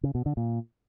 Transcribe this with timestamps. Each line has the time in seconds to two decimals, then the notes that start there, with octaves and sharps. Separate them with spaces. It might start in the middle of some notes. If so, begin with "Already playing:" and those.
0.03 C#3
0.15 B2
0.26 D3
0.37 A#2